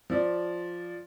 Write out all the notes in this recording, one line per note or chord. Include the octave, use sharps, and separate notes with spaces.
F3 D5